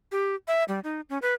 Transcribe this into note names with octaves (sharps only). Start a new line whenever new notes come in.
G4
E5
G3
D#4
C#4
B4